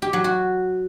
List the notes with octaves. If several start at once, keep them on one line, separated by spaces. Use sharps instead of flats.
G4
F#3
F#4